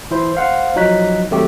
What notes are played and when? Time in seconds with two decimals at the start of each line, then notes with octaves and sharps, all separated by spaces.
0.11 E3 E4 C5
0.35 C5 F5 F#5
0.76 F3 F#3 D#4 C#5 F#6 B6
1.31 D#3 F#3 A3 C4 G4